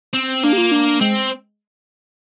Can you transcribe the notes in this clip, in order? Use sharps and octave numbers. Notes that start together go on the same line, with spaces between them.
C4
A#3 D4
G4
F4
D4
G#3 C4